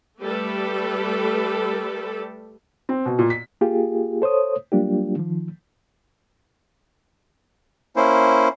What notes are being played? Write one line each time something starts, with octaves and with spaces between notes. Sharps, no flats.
G3 A3 G4 A4 B4
C4
B2
A#2
B6
A#3 F4 G4 G#4
A4 C5 C#5 D#6
F#3 G3 A#3 D4 F4 G4
D#3 F3
A#3 C#4 E4 C5